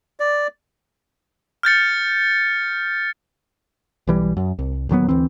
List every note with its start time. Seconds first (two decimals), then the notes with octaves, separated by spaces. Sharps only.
0.20 D5
1.63 F6 G6 A6 C#7
4.07 B1 E3 G3
4.37 F#2
4.59 C2
4.89 D1 D#2 F#3 B3
5.09 D2 E3 C4